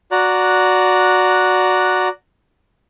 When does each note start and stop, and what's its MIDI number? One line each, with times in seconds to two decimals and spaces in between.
0.11 2.08 66
0.11 2.08 74
0.11 2.08 82
0.11 2.08 90